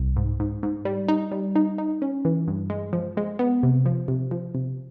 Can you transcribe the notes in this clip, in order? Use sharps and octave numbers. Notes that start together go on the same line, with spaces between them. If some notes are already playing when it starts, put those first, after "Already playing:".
Already playing: C2
G#2
G#2
G#2
G3
D#4
G3
D#4
D#4
C#4
E3
G2
G#3
F3
G#3
B3
C3
F3
C3
F3
C3